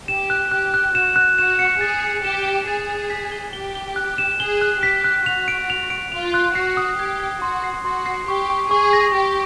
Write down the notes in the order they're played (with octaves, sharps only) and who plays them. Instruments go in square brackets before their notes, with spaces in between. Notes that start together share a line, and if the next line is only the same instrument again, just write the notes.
[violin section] G4 [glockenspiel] E7
[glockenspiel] F#6
[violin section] G4 [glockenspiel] F#6
[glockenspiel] F#6
[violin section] F#4 [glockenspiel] E7
[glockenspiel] F#6
[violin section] F#4 [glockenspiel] E7
[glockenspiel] C#7
[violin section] G#4 [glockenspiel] A6
[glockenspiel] C#7
[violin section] G4 [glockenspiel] E7
[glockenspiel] E7
[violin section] G#4 [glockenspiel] A6
[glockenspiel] A6
B6
G7
[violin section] G4 [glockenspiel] G7
[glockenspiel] G7
F#6
E7
[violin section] G#4 [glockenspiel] G7
[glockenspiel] F#6
[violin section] G4 [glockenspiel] B6
[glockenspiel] F#6
[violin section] F#4 [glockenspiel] F7
[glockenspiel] D7
F7
D7
[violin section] F4 [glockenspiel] F7
[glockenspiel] F#6
[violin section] F#4 [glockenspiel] C7
[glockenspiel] D#6
[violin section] G4 [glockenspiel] G#6
[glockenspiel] G#6
[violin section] F#4 [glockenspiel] C6
[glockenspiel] C7
[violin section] F#4 [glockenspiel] C6
[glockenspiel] C7
[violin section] G4 [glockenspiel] C#6
[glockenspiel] C#6
[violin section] G#4 [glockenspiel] C#6
[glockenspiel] A#6
[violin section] G4 [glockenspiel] A#6